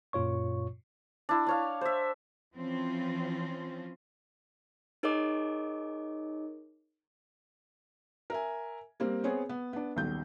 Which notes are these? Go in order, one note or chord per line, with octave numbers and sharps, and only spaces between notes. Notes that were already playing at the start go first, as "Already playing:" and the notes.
F#2 A#2 F4 C#5 C#6
D4 E4
D4 C#5 F5
C5 E5
E3 F3 C4 C#4 F4
D#4 G#4 A#4 C#5 D#5 D6
A#4 E5 G#5
G3 A#3 C4
B3 C4 G#4 C#5
B3
B3 D4
D#1 B1 D#3 G6